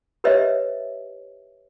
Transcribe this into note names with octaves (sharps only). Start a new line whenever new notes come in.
G4 A#4 B4 C#5 D#5 E5